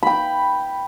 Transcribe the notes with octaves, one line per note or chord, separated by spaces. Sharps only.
G5 B5